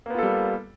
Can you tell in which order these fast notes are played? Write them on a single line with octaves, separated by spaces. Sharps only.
A#3 B3 F4 A4 G3